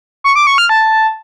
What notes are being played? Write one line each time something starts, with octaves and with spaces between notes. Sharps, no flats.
C#6
D6
C#6
F6
A5